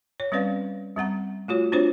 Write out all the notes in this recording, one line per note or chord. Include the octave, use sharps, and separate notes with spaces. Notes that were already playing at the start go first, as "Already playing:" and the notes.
C#5
G3 C4 C#4 B4 D5 F5
G3 C4 F#5 A#5
A3 F4 F#4 C#5
C4 D4 F4 F#4 C5 C#5